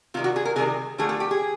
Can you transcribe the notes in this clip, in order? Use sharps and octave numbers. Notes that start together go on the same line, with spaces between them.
C3 D#3 G3 F4
F#4
G#4
A#4
C3 D#3 G3 G#4
D3 F3 A3 G#4
A4
G4
G#4